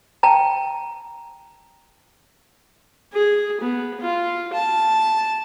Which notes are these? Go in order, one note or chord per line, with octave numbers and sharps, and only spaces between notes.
G5 A5 A#5
G#4
B3
F4
A5